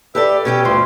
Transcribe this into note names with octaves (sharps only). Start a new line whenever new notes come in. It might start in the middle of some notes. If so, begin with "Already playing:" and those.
G4 A4 B4 D5 E5
B2 C#4 G4 G5
D2 G2 B2 F3 C6